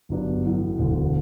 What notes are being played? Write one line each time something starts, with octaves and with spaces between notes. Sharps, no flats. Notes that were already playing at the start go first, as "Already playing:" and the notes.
G1 G2 F#3 B3 D4
A1 A2 F#3
E1 D2 D3